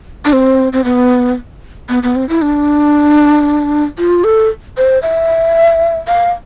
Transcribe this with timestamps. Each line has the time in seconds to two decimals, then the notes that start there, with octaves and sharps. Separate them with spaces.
0.25 D4
0.33 C4
0.73 C4
0.84 B3
1.89 B3
2.03 B3
2.16 C4
2.29 E4
2.42 D4
3.98 F4
4.24 A4
4.78 C5
5.03 E5
6.08 F5